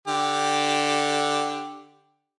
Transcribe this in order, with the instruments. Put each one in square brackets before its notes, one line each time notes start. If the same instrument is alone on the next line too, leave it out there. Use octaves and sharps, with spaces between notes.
[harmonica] D3 G4